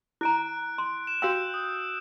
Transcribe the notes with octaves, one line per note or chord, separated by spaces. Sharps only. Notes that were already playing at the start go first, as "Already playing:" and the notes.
E4 A#5 F#6 D7
C6
E7
F#4 F5 G5 E6 G6 E7
D#6